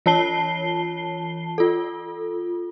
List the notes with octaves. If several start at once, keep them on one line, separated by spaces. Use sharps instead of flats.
E3 F4 C#5 A5 C7 G7
F4 A4